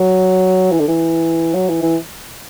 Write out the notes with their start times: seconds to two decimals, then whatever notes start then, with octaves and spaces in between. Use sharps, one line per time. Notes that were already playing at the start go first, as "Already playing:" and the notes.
Already playing: F#3
0.71 E3
0.79 D3
0.88 E3
1.54 F#3
1.69 E3
1.82 E3